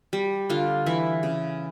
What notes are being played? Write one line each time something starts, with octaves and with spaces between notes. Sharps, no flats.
G3
D3 F4
E3 E4
C#3